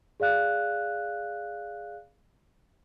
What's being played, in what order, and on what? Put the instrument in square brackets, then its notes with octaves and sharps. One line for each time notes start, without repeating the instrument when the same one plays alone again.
[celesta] G#4 D5 F5 F#6